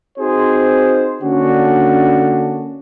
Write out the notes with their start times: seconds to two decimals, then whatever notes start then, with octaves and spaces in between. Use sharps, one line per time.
0.19 C4 D#4 F#4 G#4 C5
1.23 D3 A#3 C#4 D4 F#4